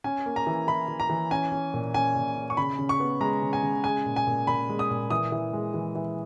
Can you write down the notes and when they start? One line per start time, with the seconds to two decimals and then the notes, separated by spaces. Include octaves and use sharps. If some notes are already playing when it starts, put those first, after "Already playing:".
0.04 C#4 G#5
0.26 A#3
0.36 A#5
0.47 E3
0.67 E3 B5
0.88 E3
1.00 A#5
1.10 E3
1.31 C#4 G#5
1.52 C#4
1.74 A#2
1.94 C#4 G#5
2.15 A#2
2.37 C#4
2.50 C#6
2.57 C#3 B5
2.79 C#3
2.89 C#6
3.00 B3
3.21 G#3 A#5
3.42 C#3
3.53 G#5
3.63 C#3
3.84 G#3 G#5
4.06 A#2
4.16 G#5
4.27 A#2
4.47 A#2 B5
4.69 G#3
4.79 D#6
4.91 A#2
5.10 E3 D#6
5.32 E3
5.53 G#3
5.74 E3
5.95 E3